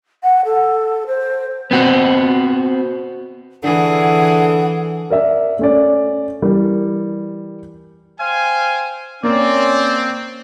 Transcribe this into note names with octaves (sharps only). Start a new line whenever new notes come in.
F#5
A4
C5
B3 C4 F#4
D3 E3 G#4 A4 F#5
A#4 D5 E5
A3 C#4 D5
E3 G3 A#4
C5 F5 G5 G#5
A#3 C4 C#4 D5